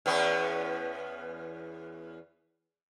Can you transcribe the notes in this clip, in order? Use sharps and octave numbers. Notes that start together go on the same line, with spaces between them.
E2 B3 C#4